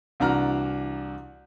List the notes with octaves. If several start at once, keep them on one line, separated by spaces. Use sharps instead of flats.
C2 E3 D4 F#4 A#5 F6